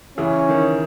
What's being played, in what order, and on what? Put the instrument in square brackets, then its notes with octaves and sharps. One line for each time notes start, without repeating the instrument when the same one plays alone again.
[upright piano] C#3 E3 [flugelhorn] C#4
[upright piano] D#3